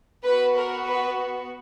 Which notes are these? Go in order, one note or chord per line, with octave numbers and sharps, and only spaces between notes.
B3 F#4 B4
A#4
B4